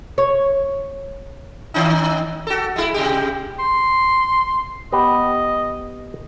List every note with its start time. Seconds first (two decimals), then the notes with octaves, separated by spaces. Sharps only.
0.18 C#5
1.74 D#3 C#4 D#4
2.47 F#4 A4
2.76 G#3 E4
2.94 C3 G#3 G4
3.59 C6
4.92 B3 G4 B4 D#5